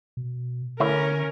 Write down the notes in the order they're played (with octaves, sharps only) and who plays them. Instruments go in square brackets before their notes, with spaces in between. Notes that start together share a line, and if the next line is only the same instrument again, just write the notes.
[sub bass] B2
[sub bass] D3 [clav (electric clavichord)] A3 E4 C#5 [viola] C#4 A#4